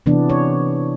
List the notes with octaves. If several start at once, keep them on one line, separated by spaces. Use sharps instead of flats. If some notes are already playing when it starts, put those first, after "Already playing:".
C3 E3 B3 D4
C#5